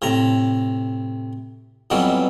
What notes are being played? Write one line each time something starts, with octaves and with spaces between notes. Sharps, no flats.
A2 C3 A#5
F2 B2 E3 F#3 G3